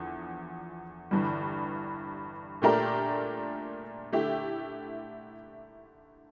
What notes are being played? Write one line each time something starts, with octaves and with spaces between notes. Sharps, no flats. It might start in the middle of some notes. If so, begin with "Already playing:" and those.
Already playing: E2 D3 F3
G1 G2 E3 G3
A#2 A3 D4 G4 A#4
D3 A3 E4 G4